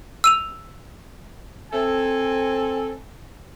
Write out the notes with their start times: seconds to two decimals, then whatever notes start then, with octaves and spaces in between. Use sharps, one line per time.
0.24 E6 D#7 F7
1.71 C4 A4 G#5